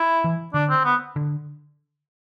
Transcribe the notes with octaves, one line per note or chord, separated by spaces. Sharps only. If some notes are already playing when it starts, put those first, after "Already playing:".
Already playing: E4
E3
D3 D4
C4
B3
D3